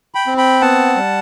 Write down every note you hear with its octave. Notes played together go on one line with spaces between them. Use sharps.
G5 B5
C4
G5 B5
B3 F#5 A5
G3